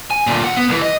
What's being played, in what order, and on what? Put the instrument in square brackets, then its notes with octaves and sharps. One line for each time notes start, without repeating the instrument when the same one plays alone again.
[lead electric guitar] G#5
D2 A#2
D2 F#5
B3
C2 E3
D#5